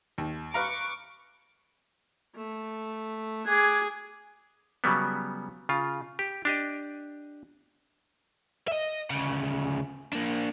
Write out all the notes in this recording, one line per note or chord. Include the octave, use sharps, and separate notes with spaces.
D#2
B4 F5 A#5 C#6 D6
A3
G#4 D6 F#6 G#6
C#3 F#3 G3 B3
C#3 F4
G4
D4 G4 D#5
D#5 E5
D2 C#3
A#3 D4